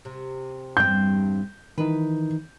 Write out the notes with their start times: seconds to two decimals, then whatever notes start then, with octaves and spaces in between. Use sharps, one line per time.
0.05 C3
0.77 E2 G2 C4 G6
1.78 D#3 E3 D#4 B4